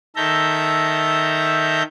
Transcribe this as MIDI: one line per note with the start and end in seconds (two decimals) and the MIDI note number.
0.16 1.83 51
0.16 1.83 69
0.16 1.83 76
0.16 1.83 82
0.16 1.83 91